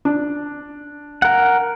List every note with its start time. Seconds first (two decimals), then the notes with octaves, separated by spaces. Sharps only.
0.05 D4
1.22 A#4 F#5